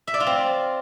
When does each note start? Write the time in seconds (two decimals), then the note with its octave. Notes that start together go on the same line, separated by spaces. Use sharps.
0.07 E5
0.14 D5
0.20 F4
0.27 C4